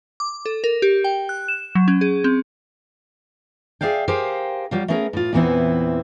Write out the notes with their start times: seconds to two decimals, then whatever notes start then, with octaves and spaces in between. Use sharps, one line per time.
0.20 D6
0.46 A4
0.64 A#4
0.82 G4
1.04 G5
1.29 F#6
1.48 E7
1.75 F#3
1.88 C#4
2.01 G#4
2.24 C4
3.81 G#4 D5 E5 F5 G5
4.08 G4 G#4 A#4 C5 F5 G5
4.71 F#3 G3 F4
4.88 A3 B3 C#4 G#4 A#4
5.13 A2 F4
5.33 E2 A#2 E3 B3 C4 E4